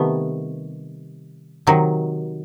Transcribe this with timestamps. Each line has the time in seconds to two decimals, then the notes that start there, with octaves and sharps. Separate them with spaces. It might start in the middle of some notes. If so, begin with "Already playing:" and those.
Already playing: C3 D#3 G3 A3 B3
1.67 C3 D#3 F#3